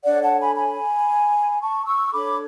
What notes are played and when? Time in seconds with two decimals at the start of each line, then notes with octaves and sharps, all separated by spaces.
0.04 D4 A4 C#5 D5 F#5
0.22 F#5 A5
0.39 G#5 B5
0.56 G#5 B5
1.61 A5 C#6
1.86 C#6 E6
2.12 D4 A4 C#5 B5 D6